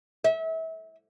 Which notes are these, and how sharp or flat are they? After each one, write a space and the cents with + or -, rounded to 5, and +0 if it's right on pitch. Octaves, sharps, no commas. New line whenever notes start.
E5 -30